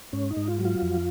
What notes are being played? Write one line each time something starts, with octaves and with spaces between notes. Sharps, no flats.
G#2 C#4
D#4
G#2
F4
F#3
F4
F2